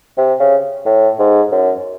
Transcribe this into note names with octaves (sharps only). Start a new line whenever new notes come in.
C3
C#3
A2
G#2
F#2